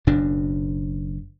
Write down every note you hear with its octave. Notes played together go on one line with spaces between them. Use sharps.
F#1 F#2 B2 D4